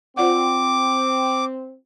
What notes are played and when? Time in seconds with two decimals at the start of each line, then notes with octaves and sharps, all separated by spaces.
0.17 C4 F4 D5 F#5 D6